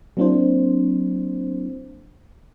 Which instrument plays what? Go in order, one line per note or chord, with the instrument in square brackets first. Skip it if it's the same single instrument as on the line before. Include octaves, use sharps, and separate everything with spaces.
[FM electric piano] F#3 A#3 C4 D4 E4 C5